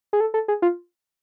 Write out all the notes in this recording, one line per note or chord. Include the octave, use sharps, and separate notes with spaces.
G#4
A4
A4
G#4
F4